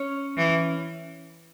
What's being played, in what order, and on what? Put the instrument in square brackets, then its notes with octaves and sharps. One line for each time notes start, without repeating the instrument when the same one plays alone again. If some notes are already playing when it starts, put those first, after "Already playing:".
Already playing: [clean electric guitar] C#4 C#5
[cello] E3